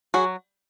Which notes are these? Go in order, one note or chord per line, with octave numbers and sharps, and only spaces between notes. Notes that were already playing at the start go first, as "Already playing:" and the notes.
F#3 F#4 G#4